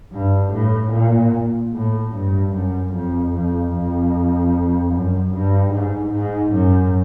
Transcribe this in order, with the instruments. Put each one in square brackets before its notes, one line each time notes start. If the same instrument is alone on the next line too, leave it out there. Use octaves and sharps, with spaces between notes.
[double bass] G2
A2
A#2
A2
G2
F#2
F2
F2
F2
F#2
G2
G#2
G#2
F#2